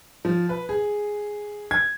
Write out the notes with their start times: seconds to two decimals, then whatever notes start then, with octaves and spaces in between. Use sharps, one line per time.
0.25 F3
0.49 B4
0.69 G#4
1.71 G#6